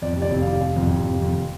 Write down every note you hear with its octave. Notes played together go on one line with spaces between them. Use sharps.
F2 D5
F1
D5
F1
F5
F1
F1
F2
F1
F1
F2